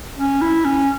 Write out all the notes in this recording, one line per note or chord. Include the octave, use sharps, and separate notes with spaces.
C#4
E4
C#4